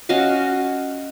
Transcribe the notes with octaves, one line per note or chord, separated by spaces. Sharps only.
C#4 F#4 D#5 F5